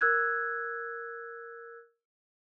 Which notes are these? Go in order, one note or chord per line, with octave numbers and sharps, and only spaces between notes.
A#4 E6 F#6 G#6